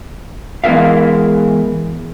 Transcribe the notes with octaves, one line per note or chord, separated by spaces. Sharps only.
E3 G#3 B3 A#4 E5 F5